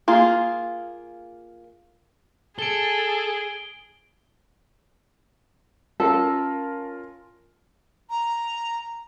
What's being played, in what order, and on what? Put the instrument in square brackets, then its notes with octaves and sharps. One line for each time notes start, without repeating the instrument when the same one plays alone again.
[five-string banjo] A#3 F4 G#4
[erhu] G#4 [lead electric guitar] A4 [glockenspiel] D7 G7
[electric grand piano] C#4 F4 A#4 [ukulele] A4
[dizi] A#5